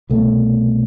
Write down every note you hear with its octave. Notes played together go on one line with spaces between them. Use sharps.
C2 B2 A3